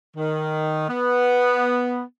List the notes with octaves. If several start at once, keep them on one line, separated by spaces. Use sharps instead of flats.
D#3
B3